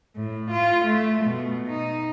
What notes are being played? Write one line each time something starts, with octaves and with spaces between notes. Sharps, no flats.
A2
F4
A3
B2
D#4